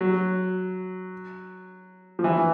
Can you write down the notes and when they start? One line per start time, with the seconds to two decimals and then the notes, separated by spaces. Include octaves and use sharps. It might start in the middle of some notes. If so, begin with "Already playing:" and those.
0.01 F#3
2.19 F3
2.24 E3